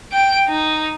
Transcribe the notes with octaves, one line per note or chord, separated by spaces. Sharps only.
G5 D7
D#4